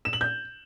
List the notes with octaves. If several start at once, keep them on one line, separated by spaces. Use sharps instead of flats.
E7
F#7
G6